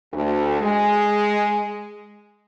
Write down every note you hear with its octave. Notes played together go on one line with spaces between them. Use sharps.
D2
G#3